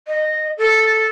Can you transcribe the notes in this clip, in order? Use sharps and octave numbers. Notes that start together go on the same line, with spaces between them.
D#5
A4